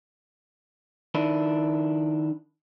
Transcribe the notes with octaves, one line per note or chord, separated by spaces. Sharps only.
D#3 D4 E4